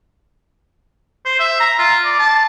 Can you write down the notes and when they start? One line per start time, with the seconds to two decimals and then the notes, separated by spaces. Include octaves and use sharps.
1.25 C5
1.40 E5
1.60 A#5
1.79 F4
2.05 D5
2.19 A5